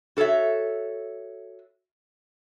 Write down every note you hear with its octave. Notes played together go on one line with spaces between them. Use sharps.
F#4 A4 A#4 C#5 E5